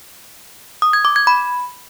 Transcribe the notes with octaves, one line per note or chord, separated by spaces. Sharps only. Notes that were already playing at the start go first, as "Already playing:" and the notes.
D#6
G#6
D6
G#6
B5